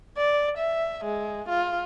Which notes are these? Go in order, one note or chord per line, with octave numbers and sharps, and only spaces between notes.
D5
E5
G#3
F4